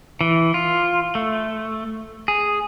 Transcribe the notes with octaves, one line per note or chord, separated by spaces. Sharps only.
E3
F4
A3
G#4